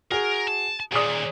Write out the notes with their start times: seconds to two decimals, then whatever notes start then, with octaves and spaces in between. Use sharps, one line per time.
0.11 F#4 G#4 A#4
0.48 A5
0.92 D#2 A#2 G#4 D5 D#6